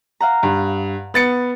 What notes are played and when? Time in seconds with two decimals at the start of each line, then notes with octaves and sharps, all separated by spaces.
0.20 F5 F#5 A#5
0.43 G2
1.14 B3 A6 C#7